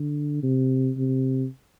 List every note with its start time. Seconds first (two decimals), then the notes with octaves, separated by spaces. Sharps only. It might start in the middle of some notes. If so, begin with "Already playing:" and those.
Already playing: D3
0.43 C3
0.97 C3